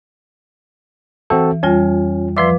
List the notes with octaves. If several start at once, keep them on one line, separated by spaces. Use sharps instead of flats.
E3 C4 F#4 A4
F2 G3 C#4 F4
F3 B4 D5 E5 C6 D6